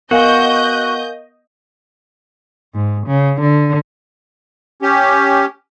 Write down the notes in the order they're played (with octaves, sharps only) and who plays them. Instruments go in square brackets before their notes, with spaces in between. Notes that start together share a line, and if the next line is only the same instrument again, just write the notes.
[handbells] B3 C#6 [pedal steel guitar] F#4 [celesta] A#4 F5 G#5 [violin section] D#5 G6
[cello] G#2
C#3
D3
[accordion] C#4 G4